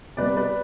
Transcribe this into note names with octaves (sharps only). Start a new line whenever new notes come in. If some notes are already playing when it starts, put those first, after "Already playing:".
C3 G3 B3 B4 D5
B4 D5